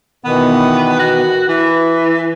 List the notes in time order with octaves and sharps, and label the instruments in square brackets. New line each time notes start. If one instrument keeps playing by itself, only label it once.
[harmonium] B2 D#3 E3 [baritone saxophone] B3
[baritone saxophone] F#4
[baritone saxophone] E3 [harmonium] B4